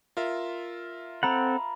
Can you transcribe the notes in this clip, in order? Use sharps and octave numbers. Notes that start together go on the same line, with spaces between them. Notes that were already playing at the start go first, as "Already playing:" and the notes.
F4 A#4 E5
C4 A4 F#5 A#5 B5